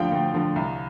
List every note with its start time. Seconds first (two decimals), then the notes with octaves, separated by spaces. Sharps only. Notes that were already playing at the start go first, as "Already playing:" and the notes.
Already playing: D2 D3 F3 F4 F5 G5
0.11 D2
0.34 D3 F3
0.56 C2